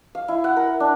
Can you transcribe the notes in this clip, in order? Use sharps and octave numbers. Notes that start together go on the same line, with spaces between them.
F5
E4
F#5
A#4
D4